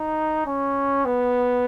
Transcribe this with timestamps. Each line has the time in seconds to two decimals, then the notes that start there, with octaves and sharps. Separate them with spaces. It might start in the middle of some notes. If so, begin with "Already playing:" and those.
Already playing: D#4
0.46 C#4
1.05 B3